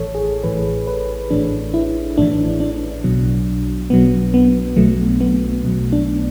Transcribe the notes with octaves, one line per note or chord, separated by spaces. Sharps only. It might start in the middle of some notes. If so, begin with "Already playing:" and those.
Already playing: A1 A2 E3 A4 C#5
G#4
A1 A2 E3 B4
B4
A1 A2 E3 D4
E4
A1 A2 E3 D4
D4
B1 B2 F#3
B1 B2 F#3 B3
B3
B1 B2 F#3 A3
B3
B1 B2 F#3
D4